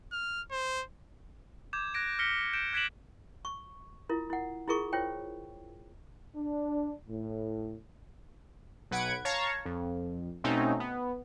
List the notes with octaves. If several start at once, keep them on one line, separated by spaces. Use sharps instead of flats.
F6
C5
D6 G6 G#6 E7
F#6 G#6 A#6 D7
F6 A#6 B6 C#7 G7
G6 D7 E7
F#6 G#6 B6 D7 E7 F#7
C#6
E4 F4 A#4
E4 F#5
E4 F4 G#4 A#4 C#6
F4 C5 C#5 G5
D4
A2
B1 B4 F#5 G#6 D7
C#5 F5 A5 A#5 C#6
F2
B2 A3 C4 C#4 D#4
B3